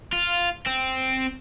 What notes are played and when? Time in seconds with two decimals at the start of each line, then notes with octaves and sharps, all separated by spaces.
0.13 F4
0.67 C4